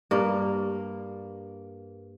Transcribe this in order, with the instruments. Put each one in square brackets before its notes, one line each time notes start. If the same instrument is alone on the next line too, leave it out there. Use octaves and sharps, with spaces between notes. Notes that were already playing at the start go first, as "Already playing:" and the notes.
[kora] G2 A#3